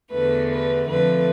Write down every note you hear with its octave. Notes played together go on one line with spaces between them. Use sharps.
E2 D3 A3 B4
B4
F2 D3 A3 B4